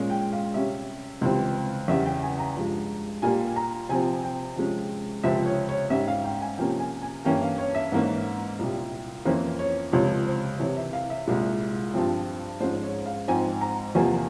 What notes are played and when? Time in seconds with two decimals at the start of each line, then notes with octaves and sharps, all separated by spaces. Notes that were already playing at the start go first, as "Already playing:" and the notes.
Already playing: A#2 G#3 C#4
0.10 G5
0.33 F5
0.54 C3 G3 C#4 E5
1.21 C#2 C3 E3 G3 C4
1.88 E2 C#3 G3 C#4 E5
2.05 G5
2.22 G#5
2.39 A#5
2.56 G2 F3 G#3
3.22 A#2 G3 A#3 G#5
3.56 A#5
3.89 C3 F3 C4 G#5
4.24 G5
4.56 C3 F3 G#3 C#4
5.24 C#2 C3 F3 C4 E5
5.46 C#5
5.69 C#5
5.90 G#2 G3 C#4 E5
6.08 F5
6.24 G5
6.41 G#5
6.58 C3 F3 A#3 C#4 G5
6.80 G#5
7.02 G#5
7.25 G2 E3 A#3 C#4 G5
7.42 F5
7.58 C#5
7.75 E5
7.92 G#2 E3 A#3 C#4
8.59 C2 A#2 G3
9.25 F2 E3 A#3 C#4 C5
9.59 C#5
9.92 C#2 C3 F3 C#5
10.27 C5
10.60 C2 C3 E3 C#5
10.77 E5
10.93 F5
11.10 E5
11.27 C2 A#2 G#3
11.94 G2 F3 C4
12.60 G#2 F3 G#3 C#4 C5
12.83 C#5
13.06 F5
13.28 G#2 F3 C4 G#5
13.61 A#5
13.95 E2 C3 F3 A#3 G#5